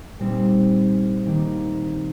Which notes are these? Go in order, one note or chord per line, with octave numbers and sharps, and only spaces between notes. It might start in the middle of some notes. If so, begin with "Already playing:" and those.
A#2 G3 C4 D#4
D#3 A#3 D#4